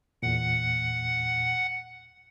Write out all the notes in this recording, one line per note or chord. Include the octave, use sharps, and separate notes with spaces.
E2 A#2 F#5